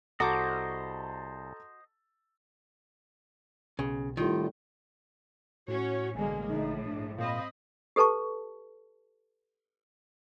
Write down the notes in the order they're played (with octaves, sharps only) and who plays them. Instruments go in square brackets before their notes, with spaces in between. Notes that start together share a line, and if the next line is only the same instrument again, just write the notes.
[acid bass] C2 [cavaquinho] F#4 D6 [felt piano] A4 A5 A#5 [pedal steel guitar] C5 D#5
[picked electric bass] B1 [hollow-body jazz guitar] C#3
[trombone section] C2 A2 G3 [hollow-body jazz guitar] D#3 [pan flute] F4
[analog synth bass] A2 [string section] C#4 C#5 [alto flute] F#4
[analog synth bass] A1 [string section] B2 F#3 A#3 [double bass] D3 G#3 [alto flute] G#5
[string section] A#1 A2 [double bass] D3 [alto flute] D#4
[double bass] G#2 [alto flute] D4
[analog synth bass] A#2 [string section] C4 D#5 B5 [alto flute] F5
[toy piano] G4 A4 B4 A5 C#6